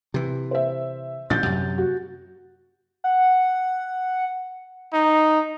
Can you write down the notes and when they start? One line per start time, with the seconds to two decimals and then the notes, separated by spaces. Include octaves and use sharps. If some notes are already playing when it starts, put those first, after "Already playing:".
0.14 C3 E3
0.51 C5 E5
1.30 A1 A#2 D3 G6 A6
1.43 F#2 C3
1.78 F#4
3.04 F#5
4.93 D#4